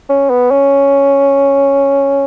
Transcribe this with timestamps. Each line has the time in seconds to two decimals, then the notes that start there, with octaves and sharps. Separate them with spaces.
0.10 C#4
0.30 B3
0.51 C#4